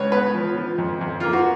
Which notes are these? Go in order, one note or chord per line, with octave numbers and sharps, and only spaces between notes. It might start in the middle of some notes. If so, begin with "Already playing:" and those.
Already playing: C#2 C#3 B4 C#5
B3 B4
F3
F3
F2
F2
A#3 F4
F#4